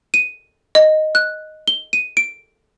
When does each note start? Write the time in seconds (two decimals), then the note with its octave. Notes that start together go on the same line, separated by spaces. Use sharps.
0.14 D#7
0.75 D#5
1.15 F#6
1.68 G7
1.93 D#7
2.17 D7